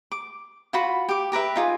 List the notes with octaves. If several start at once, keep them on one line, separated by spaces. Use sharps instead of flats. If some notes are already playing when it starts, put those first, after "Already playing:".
D6
F4 F#4 B5
G4 D6
G4 A#4 B4 E5
D#4 F4 G#4